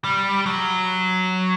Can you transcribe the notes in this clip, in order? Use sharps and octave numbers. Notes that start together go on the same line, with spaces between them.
G3
F#3